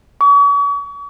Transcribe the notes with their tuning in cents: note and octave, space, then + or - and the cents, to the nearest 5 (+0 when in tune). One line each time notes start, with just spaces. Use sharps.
C#6 +40